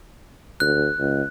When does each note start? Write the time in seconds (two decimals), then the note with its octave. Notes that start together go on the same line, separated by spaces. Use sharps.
0.60 D2 F#6
0.99 C#2